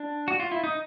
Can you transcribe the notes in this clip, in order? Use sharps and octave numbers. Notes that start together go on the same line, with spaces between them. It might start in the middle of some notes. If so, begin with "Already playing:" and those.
Already playing: D4
F#4
F4
E4
D#4